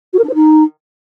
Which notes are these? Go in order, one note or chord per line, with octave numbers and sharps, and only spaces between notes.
F#4
A#4
D4
C5
D#4